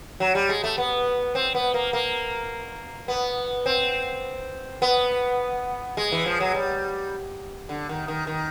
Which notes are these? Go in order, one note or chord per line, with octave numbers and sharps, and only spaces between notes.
F#3
G3
G#3
A3
B3
C4
B3
A#3
A#3
B3
C4
B3
G#3
E3
F3
F#3
G3
D3
D#3
D#3
D#3